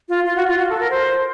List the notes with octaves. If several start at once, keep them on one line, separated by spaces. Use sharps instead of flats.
F4
F4
F#4
F4
F#4
A4
A#4
C5